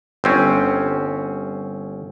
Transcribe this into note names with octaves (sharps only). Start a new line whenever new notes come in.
G1 C4 C#4